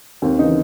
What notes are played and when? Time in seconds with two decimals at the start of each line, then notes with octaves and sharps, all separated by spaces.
0.22 D#2 C4
0.39 C#3 E3 D#4